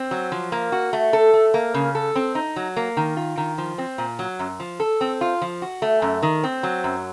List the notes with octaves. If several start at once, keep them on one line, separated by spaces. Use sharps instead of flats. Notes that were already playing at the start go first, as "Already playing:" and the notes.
Already playing: C4
F#3
F3
A#3
F#4
A3
A4
A3
A#3
C#3
A4
C4
D#4
F#3
A#3
D#3
F4
D#3
F3
C4
A#2
F#3
F#2
F3
A4
C4
F4
F3
F#4
A3
F#2
D#3
C4
F#3
F#2